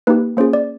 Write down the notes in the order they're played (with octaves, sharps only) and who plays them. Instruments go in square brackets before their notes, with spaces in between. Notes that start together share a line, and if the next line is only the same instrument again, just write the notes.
[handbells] A#3 D#4 G4 B4
A#3 C#4 F4 G#4 C5
D5